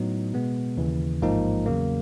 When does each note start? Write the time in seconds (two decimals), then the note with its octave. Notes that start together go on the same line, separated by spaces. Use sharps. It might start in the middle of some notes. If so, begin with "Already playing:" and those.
Already playing: A2 F#3 B3 D#4
0.33 B2 G#3 B3
0.77 D#2 C#3 E3
1.22 A1 G#2 F3 A#3 D#4
1.66 E2 C#3 F#3 A#3